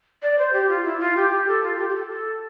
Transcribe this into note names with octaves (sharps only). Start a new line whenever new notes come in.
D5
C5
G4
F4
E4
F4
G4
A4
F4
G4
G4
A4
A4